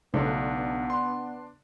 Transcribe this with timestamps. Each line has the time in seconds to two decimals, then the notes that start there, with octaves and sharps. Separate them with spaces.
0.14 B1 C#3 A3 B3 D4
0.90 C6